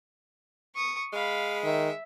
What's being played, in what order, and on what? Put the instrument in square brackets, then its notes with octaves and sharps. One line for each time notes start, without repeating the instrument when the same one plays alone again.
[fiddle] C#6 D#6
[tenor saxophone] G#3 [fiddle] F5 B5
[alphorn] D#3 [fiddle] E5